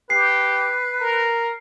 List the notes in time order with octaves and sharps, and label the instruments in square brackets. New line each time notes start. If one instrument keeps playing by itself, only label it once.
[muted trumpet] G4 [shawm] B4 [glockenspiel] C7
[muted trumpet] A#4